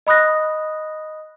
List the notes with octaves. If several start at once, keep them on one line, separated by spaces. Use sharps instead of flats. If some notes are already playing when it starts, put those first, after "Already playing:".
D#5 B5 D#6 F#6 A#6